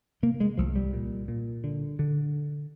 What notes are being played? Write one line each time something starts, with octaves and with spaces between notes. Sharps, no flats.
C3 A#3
G#3
C2 F3
G3
A#2
A#2
D3
D3